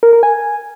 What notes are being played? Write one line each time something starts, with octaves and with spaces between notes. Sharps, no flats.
A#4
A#4
G#5